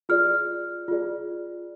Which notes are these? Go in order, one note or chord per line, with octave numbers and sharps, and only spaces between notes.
F4 G#4 D5 F6
F4 G#4 D5